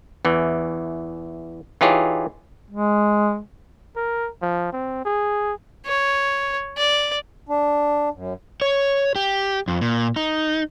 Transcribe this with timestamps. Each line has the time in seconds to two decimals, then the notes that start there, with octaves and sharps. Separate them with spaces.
0.25 E2 E3
1.81 E3 D#4 F4 G4 G#4 C#5
2.71 G#3
3.96 A#4
4.42 F3
4.73 C4
5.05 G#4
5.86 C#5
6.78 D5
7.49 D4
8.14 F#2
8.62 C#5
9.16 G4
9.68 F2
9.81 A#2
10.16 D#4